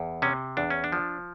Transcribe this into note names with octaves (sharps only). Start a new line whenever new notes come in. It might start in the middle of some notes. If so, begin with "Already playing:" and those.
Already playing: E2
C3 C#4
E2 D4
C#4
D4
F3